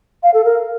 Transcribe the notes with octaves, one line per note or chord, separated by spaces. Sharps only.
F5
A4
A#4